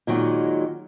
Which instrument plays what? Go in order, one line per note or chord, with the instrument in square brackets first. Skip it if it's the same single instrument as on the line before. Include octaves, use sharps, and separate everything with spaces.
[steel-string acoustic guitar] A#2 D#3 F#3 G#3